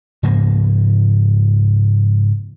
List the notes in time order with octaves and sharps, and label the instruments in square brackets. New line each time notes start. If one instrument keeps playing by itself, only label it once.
[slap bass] G#2 C#3 F3 A#3